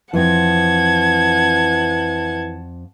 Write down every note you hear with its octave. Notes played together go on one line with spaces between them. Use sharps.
F2 E3 C4 F#5 A5 G#6